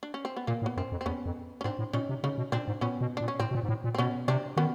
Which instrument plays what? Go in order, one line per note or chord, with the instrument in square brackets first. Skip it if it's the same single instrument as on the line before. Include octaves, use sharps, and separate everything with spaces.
[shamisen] D4
C#4
C4
B3
[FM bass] A#2 [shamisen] A#3
[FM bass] A2
[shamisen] B3
[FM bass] F#2 [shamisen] C4
[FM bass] F2
[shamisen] C4
[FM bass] E2 [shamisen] B3 C#4
[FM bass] F2
[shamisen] C#4
[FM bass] G#2 [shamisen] C4 D4
[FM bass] A2
[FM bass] A#2 [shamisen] C#4 D#4
[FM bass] C3
[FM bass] C#3 [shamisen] C#4 D#4
[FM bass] B2
[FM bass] A#2 [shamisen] C4 D4
[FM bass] G#2
[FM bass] A#2 [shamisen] B3 C#4
[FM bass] B2
[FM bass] A#2 [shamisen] D4
[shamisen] C#4
[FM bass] A2 [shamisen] C4
[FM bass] B2
A#2
G#2
A2
A#2
[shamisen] C4
[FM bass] B2 [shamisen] B3 C#4
[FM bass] C3 [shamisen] C4 D4
[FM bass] D#3 [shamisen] B3 C#4